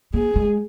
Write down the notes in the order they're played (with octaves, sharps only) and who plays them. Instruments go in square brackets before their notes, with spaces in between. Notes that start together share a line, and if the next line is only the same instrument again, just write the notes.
[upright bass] A#3 [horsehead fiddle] G#4
[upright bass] G#3